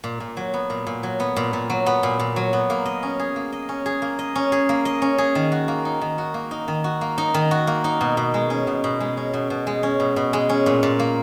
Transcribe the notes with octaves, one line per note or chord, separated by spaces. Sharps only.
A#2
A#2
F#3
B3
A#2
A#2
F#3
B3
A#2
A#2
F#3
B3
A#2
A#2
F#3
B3
A#3
D#5
C#4
G#4
A#3
D#5
C#4
G#4
A#3
D#5
C#4
G#4
A#3
D#5
C#4
G#4
D#3
F#4
A#3
D#4
D#3
F#4
A#3
D#4
D#3
F#4
A#3
D#4
D#3
F#4
A#3
D#4
B2
B2
G#3
C#4
B2
B2
G#3
C#4
B2
B2
G#3
C#4
B2
B2
G#3
C#4
A#2
A#2
A#3